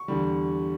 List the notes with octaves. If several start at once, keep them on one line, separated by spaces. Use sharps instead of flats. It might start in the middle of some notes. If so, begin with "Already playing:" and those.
Already playing: C#6
E2 D3 G3